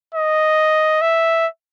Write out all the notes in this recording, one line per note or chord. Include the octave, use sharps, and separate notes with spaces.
D#5
E5